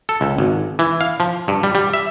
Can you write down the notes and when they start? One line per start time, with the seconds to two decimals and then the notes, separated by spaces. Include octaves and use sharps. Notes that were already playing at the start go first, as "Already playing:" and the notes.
0.09 A4
0.21 C#2
0.38 G#1
0.79 E3
1.01 F5
1.20 F3
1.48 G2
1.63 G3
1.75 G3
1.94 E5